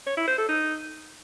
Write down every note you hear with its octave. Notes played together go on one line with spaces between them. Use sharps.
C#5
E4
C5
A4
D#4